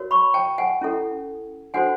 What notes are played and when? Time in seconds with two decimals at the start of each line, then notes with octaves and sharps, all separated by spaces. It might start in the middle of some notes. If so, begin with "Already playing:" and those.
Already playing: F#4 A#4 C#5
0.11 B5 C#6
0.34 G5 A5
0.58 F#5 G#5
0.81 C#4 E4 A4
1.74 D4 F#4 A4 C5 F#5 G#5